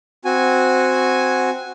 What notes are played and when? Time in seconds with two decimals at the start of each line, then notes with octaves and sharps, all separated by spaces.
0.25 C4 F#4 G#5